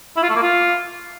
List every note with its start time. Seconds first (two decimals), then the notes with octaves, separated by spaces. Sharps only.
0.16 E4
0.23 F4
0.29 A3
0.36 A#3
0.42 F4